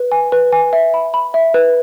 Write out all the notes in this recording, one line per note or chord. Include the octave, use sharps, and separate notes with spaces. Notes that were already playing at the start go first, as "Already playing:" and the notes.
Already playing: B4
G#5
B4
G#5
E5
B5
B5
E5
B4